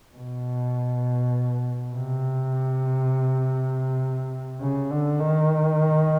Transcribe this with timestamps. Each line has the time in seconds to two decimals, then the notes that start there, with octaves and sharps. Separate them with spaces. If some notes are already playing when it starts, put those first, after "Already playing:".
0.16 B2
1.94 C3
4.61 C#3
4.91 D3
5.20 D#3